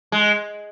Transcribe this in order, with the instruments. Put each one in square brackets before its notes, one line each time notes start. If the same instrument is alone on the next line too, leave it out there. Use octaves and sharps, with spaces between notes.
[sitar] G#3